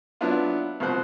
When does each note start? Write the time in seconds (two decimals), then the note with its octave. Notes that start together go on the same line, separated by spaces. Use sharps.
0.21 F#3 B3 D4 E4 F4
0.80 C2 B2 F3 C5 F#6